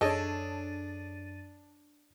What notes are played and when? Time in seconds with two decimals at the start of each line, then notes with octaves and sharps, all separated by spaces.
0.01 F#2 D4 G#4 A4 C#5 D#5 A6 D#7